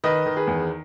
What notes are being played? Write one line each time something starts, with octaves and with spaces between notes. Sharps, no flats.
D#3 B4 D#5
D#3
G#4 B4
E2